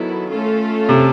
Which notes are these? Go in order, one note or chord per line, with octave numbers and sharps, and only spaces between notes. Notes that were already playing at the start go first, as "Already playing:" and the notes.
Already playing: D#3 F#3 B3 E4 A4
A3 C#4 F4 A4
C3